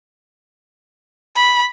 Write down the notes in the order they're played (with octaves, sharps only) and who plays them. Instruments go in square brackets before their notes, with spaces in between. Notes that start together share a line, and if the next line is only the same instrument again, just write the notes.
[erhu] B5